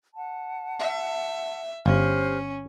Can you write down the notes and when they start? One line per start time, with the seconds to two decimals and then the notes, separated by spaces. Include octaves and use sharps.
0.15 F#5 A5
0.80 E5
1.86 G1 C#4 G4 C5 F6